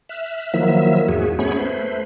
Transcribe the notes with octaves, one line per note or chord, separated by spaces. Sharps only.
E5 F6 F#6
D#3 F3 F#3 A#3 E4 E5
E2 G#2 F#4 G#4
A3 B3 C#4 G#4 C#5 B5
A3 B4 C5